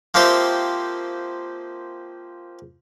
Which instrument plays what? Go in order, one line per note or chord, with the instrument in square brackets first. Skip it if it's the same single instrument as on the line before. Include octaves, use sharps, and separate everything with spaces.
[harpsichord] F3 A#3 C4 G4 E5